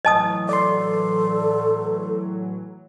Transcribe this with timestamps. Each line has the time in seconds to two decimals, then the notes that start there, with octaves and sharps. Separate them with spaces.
0.05 A2 E3 F#3 D#5 A5 D#6
0.49 A4 D5 C6